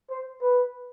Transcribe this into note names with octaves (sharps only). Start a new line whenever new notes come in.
C5
B4